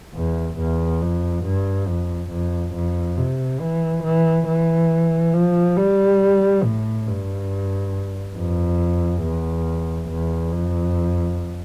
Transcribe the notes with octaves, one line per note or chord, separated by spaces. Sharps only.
E2
E2
F2
G2
F2
F2
F2
C3
E3
E3
E3
F3
G3
A2
G2
F2
E2
E2
F2